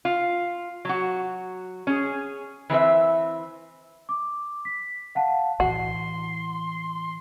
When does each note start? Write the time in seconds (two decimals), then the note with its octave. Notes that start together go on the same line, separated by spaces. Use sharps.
0.05 F4
0.85 F#3 F#4
1.87 C#4 G#4
2.70 E3 C4 B4 E5
4.09 D6
4.65 B6
5.15 F5 F#5 A5
5.60 A2 E3 F#4 C6